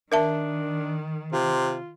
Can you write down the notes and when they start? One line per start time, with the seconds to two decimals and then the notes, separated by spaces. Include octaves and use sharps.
0.12 D#3 D4 A#4 E5 A5
1.33 C3 F4